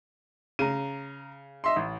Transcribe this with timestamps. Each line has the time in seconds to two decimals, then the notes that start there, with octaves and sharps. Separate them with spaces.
0.59 C#3 A#5 D#7
1.64 D#5 E5 C6
1.76 A1